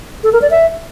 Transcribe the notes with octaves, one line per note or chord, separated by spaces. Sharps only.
A4
A#4
D5
E5